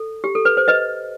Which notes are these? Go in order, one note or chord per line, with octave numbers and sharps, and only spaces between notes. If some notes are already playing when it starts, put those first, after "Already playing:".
Already playing: A4
G4
A4
B4
C5
B4 D#5